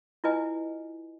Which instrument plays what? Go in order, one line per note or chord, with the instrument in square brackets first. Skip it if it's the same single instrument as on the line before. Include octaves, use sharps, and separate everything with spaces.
[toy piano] E4 F4 B4 D#5 G#5